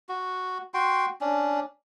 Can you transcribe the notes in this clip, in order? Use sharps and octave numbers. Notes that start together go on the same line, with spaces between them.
F#4
F#4 G5 C6
C#4 D4